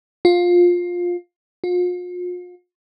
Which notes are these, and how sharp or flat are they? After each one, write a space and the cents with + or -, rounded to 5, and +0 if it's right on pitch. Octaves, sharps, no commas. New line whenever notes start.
F4 +15
F4 +40